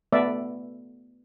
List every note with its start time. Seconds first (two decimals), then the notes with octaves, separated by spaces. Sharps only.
0.13 A3 B3 D5 E5